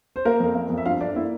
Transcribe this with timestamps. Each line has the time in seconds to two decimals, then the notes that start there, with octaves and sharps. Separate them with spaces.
0.16 C5
0.25 A#3 A#4
0.40 F2
0.55 A#3
0.70 F2
0.77 E5
0.85 G2 F4 F5
1.00 G2 D4 D5
1.16 A#3 E4 E5